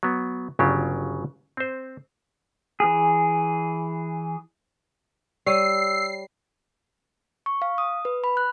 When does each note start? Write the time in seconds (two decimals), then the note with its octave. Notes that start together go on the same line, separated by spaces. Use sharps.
0.03 F#3 B3
0.59 G1 C#3 F#3 F4 G4 D5
1.57 C4 C5
2.80 E3 G#4
5.46 G3 C#5 E6 C7 D#7
7.46 C#6
7.62 F5
7.78 D#6
8.05 B4
8.24 B5
8.37 F#6